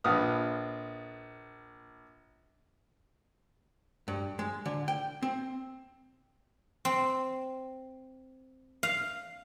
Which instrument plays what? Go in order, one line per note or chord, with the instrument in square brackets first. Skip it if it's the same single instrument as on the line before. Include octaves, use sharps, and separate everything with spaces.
[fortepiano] A#1 F4 B4 D#6 F6
[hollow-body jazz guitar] G2
G#3
D3
G5
C4
[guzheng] C4
F5